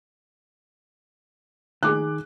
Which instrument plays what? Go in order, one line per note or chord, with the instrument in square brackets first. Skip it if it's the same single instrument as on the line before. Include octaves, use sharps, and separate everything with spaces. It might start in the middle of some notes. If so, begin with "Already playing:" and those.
[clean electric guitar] D#3 [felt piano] G#4 D6 F#6